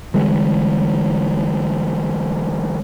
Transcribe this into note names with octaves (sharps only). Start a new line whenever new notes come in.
D3 E3 G3 G#3